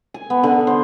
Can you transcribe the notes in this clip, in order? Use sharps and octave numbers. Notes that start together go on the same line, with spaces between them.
G#5
B3
D3
C5